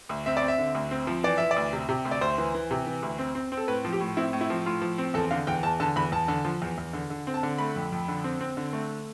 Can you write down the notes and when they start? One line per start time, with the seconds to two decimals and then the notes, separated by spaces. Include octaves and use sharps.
0.09 D2
0.26 C4 E5
0.37 D5
0.42 C4
0.48 E5
0.58 D3
0.75 D2
0.91 C4
1.07 F3
1.24 E3 D5
1.38 E3 E5
1.51 D5
1.56 D2
1.73 C3
1.89 C3
2.05 D2
2.11 D5
2.21 D2 C5
2.38 E3
2.55 E3
2.71 C3
2.87 E3
3.02 D2
3.19 C4
3.35 C4
3.52 C4
3.57 A4
3.68 A2 B4
3.85 F3
3.93 G4
4.00 A2
4.17 C4 E4
4.33 A2
4.41 E4
4.50 F3
4.65 A2 F4
4.81 F3
4.98 C4
5.14 E2 A4
5.31 D3 F5
5.47 E2 G5
5.63 E2 A5
5.80 D3 A5
5.96 E2 B5
6.12 E2 A5
6.28 D3
6.45 F3
6.62 E2
6.78 E2
6.93 D3
7.10 D3
7.27 C4
7.34 A5
7.43 D3
7.58 A3 B5
7.76 F2
7.92 F2
8.08 D3
8.24 C4
8.41 C4
8.57 D3
8.73 A3